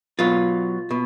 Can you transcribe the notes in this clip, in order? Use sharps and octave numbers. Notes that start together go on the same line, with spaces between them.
B2 F#3 F4
B2